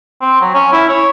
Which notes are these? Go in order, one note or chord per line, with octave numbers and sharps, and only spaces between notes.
C4
F#3
C#4
E4
C#5